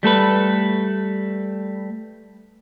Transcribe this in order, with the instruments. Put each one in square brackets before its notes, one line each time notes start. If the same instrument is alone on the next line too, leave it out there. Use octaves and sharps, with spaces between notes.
[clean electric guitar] G3 A3 A4 B4